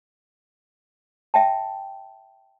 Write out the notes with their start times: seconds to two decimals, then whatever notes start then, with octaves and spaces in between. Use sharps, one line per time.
1.34 E5 G5 A5